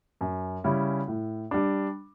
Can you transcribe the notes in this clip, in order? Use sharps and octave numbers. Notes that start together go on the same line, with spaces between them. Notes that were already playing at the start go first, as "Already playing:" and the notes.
F#2
C#3 G3 C#4 E4
A2
G3 D4